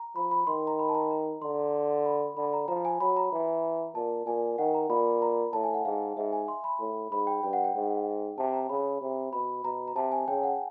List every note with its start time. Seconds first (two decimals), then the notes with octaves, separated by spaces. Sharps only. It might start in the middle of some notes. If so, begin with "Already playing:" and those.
Already playing: A#5
0.16 F3 B5
0.31 B5
0.47 D#3 C6
0.67 A#5
0.79 B5
0.89 A5
0.95 A#5
1.11 A#5
1.42 D3 C6
2.05 B5
2.37 D3 B5
2.53 A#5
2.68 F3 A#5
2.85 G#5
3.01 F#3 B5
3.17 A#5
3.33 E3
3.95 A#2 A5
4.26 A#2 G#5
4.58 D#3 F#5
4.75 A#5
4.90 A#2 B5
5.22 A#5
5.53 A2 A5
5.64 G#5
5.74 F#5
5.85 G#2 F5
6.17 G#2 E5
6.33 G#5
6.48 C6
6.64 B5
6.80 A2
7.11 G#2 B5
7.27 G5
7.43 G2 G5
7.53 F#5
7.64 G5
7.75 G#2
8.38 C3 A5
8.53 A#5
8.69 C#3 B5
9.01 C3
9.33 B2 B5
9.65 B2 A#5
9.88 A#5
9.95 C3 A5
10.12 G#5
10.28 C#3 G5
10.43 F#5